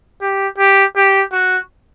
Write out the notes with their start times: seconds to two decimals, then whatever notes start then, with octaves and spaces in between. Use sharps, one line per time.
0.21 G4
0.58 G4
0.96 G4
1.33 F#4